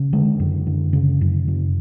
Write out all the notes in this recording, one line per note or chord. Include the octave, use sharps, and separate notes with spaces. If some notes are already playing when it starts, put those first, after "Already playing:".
Already playing: C#3
D3 G#3
F#2
D3
C#3
F#2
C#3